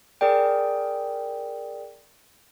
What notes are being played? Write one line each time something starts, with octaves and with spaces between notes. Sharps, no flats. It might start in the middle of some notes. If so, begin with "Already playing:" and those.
G#4 A#4 D5 G5